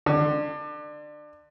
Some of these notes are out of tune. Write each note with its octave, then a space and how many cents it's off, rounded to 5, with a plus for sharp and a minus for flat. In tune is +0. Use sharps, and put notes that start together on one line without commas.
D3 +25